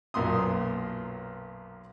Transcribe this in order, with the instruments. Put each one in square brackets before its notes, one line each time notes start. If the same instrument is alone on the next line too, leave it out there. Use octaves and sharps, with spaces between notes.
[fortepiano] B1 F#2 A#2 C6 D#6